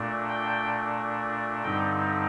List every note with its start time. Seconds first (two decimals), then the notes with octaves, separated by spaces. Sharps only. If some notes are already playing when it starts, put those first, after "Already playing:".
Already playing: A#2 A3 D4
0.29 G5
1.63 G2 D3 G3 C4 D#4 G5